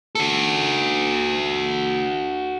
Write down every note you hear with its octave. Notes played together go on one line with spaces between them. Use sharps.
F#4 A4